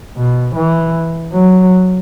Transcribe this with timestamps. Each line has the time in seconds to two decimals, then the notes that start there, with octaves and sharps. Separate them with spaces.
0.16 B2
0.56 E3
1.33 F#3